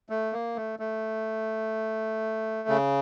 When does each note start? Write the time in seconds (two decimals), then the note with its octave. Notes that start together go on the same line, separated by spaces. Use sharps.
0.10 A3
0.33 A#3
0.56 A3
0.79 A3
2.69 C#3